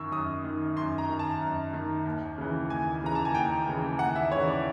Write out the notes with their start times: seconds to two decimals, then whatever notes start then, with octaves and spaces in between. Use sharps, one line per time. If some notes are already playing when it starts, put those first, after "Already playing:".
Already playing: F#2 D#3 C#6 E6
0.12 F#2 D#6
0.44 D#3
0.76 F#2 C6
0.98 A#5
1.09 D#3
1.19 A5
1.41 F#2
1.73 D#3
2.05 D#2
2.38 C#3 E3
2.70 D#2 G#5
3.02 C#3 E3 A#5
3.15 A5
3.25 G#5
3.34 D#2 G5
3.67 C#3 E3
3.99 D#2 F#5
4.16 E5
4.31 C#3 E3 C#5
4.48 D5